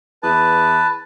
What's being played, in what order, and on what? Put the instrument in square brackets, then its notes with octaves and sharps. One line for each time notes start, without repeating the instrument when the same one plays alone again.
[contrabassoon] E2 [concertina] B4 A5